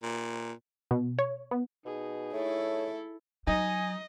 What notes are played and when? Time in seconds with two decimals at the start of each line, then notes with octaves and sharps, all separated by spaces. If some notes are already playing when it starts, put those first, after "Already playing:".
0.03 A#2
0.91 B2
1.19 C#5
1.51 B3
1.85 B2 D#4 G#4
2.34 A3 E4 A4 C#5
3.47 F#3 D#4 D#5 G#5